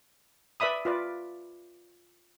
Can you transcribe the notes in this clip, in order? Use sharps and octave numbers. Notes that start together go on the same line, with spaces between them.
B4 D5 E5 B5 D#6
F4 B4 D5